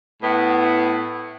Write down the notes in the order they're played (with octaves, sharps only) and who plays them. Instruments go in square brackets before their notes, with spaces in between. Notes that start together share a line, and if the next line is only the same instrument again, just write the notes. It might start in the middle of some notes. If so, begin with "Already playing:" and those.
[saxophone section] A2 B3